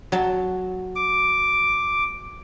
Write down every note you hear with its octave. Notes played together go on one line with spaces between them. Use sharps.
F#3 A5
D6